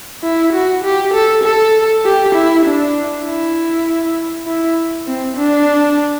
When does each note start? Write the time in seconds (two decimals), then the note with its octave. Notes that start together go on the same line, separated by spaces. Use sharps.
0.24 E4
0.53 F#4
0.84 G4
1.14 A4
1.44 A4
2.05 G4
2.35 E4
2.65 D4
3.25 E4
4.48 E4
5.08 C4
5.37 D4